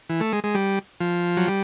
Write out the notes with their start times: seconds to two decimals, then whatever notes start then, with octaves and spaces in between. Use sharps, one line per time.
0.09 E3
0.20 A3
0.33 G#3
0.44 G#3
0.55 G3
1.01 F3
1.37 F#3
1.48 G3